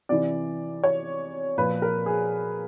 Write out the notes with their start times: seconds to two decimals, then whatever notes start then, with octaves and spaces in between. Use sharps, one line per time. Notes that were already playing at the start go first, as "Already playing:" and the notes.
0.09 C3 E3 D5
0.84 C#5
1.57 A#2 F3 B4
1.82 A#4
2.06 G#4